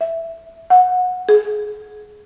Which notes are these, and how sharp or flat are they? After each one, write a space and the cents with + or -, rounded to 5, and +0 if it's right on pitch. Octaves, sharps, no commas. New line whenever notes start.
E5 +5
F#5 -25
G#4 +15